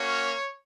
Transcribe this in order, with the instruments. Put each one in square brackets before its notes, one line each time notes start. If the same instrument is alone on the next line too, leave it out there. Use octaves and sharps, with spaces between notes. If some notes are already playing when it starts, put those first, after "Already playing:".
Already playing: [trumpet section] A#3 C#4 F#4 C#5